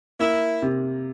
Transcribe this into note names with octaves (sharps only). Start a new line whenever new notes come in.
A#3 E4
C3